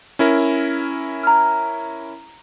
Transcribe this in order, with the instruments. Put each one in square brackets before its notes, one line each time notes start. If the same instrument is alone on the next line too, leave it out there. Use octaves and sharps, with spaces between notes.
[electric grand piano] C#4 E4 A#4
[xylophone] A#5 F6